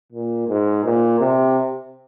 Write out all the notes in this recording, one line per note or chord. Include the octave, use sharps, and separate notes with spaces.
A#2
G#2
A#2
C3